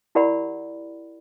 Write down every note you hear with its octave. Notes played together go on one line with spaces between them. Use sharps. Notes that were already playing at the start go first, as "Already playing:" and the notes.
E4 G4 A#4 D5 F#5 B5